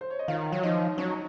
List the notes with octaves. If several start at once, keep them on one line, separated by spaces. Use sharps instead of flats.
C5
C#5
D#5
D#3 F4 F5
F#3 C#5
F3 D#4 D#5
F#3 C#4 C#5